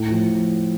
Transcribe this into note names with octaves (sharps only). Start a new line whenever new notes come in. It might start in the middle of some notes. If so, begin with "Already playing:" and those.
Already playing: A2
F3